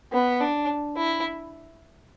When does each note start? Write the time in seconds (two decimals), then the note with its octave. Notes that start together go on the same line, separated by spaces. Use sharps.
0.12 B3
0.40 D4
0.97 E4